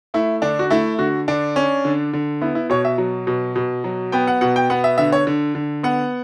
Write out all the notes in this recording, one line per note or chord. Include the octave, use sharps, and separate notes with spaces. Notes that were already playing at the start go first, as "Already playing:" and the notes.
A3 E4
D3 D4
F#4
A3 E4
D3 F#4
D3 D4
C#4
D3
D3
B3 E4
E4
B2 C#5
E5
F#3
B2
B2
F#3
B3 G5
F#5
B2 F#5
G5
B3 F#5
E5
D3 E5
C#5
D3
D3
B3 F#5